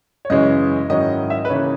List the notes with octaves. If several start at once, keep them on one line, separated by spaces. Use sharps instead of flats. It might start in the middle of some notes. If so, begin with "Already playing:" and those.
C#5
F#2 C#3 E3 G#3 C#4 D#5
G#2 D#3 F#3 C#4 E4 D#5
E5
D#5
B4
C#3 E3 A#3 D#4 C#5